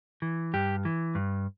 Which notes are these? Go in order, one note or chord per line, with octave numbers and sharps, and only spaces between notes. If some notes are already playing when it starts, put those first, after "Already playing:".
E3
G2 G4
E3
G2